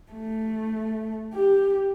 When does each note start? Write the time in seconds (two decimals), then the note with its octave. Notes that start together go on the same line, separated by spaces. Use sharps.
0.12 A3
1.34 G4